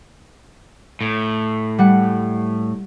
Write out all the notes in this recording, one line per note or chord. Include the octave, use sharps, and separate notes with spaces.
A2
G3 F#5